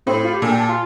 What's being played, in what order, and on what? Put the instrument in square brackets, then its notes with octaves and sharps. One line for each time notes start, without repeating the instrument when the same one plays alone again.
[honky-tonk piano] A2 [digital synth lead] C4
[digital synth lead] F4
G4
[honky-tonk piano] A#2 [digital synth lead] A4
[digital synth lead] G4
A4
F4